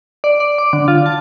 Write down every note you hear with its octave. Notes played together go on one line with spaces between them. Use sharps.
D5
D5
D6
D3
F4
A5